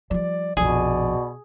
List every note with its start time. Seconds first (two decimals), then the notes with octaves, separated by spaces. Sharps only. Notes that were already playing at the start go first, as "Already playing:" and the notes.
0.11 F3 G3 D5
0.57 A#1 F2 B2 G#4 D5